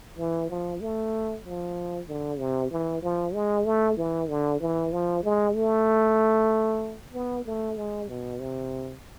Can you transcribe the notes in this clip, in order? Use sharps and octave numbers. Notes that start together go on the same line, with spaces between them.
E3
F3
A3
F3
D3
C3
E3
F3
G#3
A3
E3
D3
E3
F3
G#3
A3
B3
A3
G#3
B2
C3